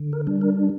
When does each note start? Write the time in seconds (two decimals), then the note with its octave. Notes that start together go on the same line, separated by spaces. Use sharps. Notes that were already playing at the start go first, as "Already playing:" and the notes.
Already playing: D3
0.13 A#4
0.27 G3 D4
0.41 A#4